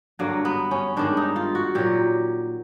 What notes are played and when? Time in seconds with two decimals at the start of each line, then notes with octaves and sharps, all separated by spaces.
0.19 G2 D3 F#3 A#3
0.45 B3
0.71 C#4
0.97 G2 D#3 G#3 D4
1.17 D#4
1.36 F4
1.55 F#4
1.75 A#2 F#3 G4